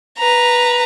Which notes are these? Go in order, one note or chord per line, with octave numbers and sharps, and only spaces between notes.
B4 A#5